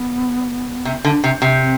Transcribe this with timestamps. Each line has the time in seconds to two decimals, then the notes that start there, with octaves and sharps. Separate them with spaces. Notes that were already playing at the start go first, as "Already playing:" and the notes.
Already playing: B3
0.85 C3
1.05 D3
1.24 C3
1.42 C3
1.61 C4